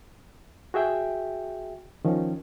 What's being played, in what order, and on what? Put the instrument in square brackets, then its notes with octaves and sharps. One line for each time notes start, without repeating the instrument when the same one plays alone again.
[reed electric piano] F#4 G#4 E5 G5
D#3 F3 C#4